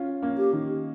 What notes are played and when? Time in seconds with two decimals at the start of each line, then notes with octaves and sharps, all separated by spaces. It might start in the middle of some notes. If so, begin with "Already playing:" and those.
Already playing: C#4 F4
0.22 A#3 C#4
0.38 G4
0.53 D#3